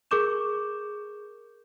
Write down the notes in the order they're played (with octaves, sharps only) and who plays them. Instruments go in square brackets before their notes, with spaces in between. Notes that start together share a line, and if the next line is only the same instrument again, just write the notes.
[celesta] G#4 A#4 C#6 D6 G6 E7